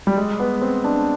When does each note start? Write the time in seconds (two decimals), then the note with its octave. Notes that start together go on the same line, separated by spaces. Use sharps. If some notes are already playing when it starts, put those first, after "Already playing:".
0.07 G3
0.17 G#3
0.39 B3
0.61 C4
0.84 D4